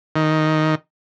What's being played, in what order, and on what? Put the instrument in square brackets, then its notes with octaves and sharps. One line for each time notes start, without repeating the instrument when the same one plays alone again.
[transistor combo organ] D#3